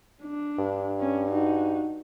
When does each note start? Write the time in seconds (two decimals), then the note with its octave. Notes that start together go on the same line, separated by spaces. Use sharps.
0.23 D4
0.59 G2
1.00 C#4
1.31 D#4 F#4